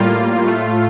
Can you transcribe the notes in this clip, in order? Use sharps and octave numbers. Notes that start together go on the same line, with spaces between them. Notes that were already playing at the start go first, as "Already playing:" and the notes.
Already playing: A2 G3 A#3 F4
A2 A3